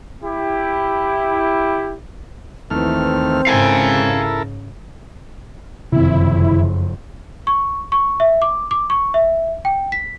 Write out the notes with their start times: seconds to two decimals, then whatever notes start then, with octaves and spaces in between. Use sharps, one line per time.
0.23 E4 G4
2.70 D#2 E3 A3 C4 F6
3.47 G#2 C#3 E4 A4 A#4 F5 G#5
5.92 F#1 F2 C3 D#3 C4 E4
7.47 C#6
7.92 C#6
8.20 E5
8.42 D6
8.71 D6
8.90 C#6
9.14 E5
9.65 G5
9.92 B6